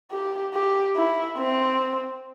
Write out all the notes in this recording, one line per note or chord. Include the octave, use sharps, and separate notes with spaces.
G4
G4
E4
C4